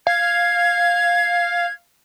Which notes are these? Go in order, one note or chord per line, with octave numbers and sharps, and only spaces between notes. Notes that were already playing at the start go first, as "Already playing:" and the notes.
F5 G#6